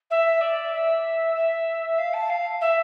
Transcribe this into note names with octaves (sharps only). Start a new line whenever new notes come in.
E5
D5
E5
E5
F5
A5
F5
E5